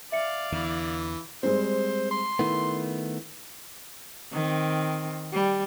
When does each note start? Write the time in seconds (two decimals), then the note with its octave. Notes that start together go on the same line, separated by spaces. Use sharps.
0.12 D5 E5 F5 C#7
0.52 E2 D3 E3
1.43 G3 G#3 C4 C5
2.11 C6
2.39 D#3 A3 B3 E4
4.33 D#3 C4
5.33 G3